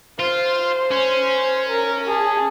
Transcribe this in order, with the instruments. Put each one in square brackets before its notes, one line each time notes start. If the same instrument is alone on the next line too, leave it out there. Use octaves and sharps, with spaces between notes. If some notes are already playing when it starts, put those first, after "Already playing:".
[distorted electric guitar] F4 [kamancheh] C5
[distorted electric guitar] C#4
[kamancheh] A#4
G#4 A5